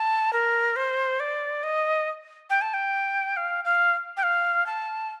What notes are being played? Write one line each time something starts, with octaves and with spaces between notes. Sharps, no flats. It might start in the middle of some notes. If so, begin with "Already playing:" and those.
Already playing: A5
A#4
C5
D5
D#5
G5
A5
G5
F5
F5
G5
F5
A5